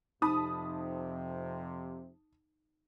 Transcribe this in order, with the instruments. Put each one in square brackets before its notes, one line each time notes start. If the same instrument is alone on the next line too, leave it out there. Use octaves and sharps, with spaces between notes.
[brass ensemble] F2 C3 [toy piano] D#4 [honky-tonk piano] A5 B5 D#6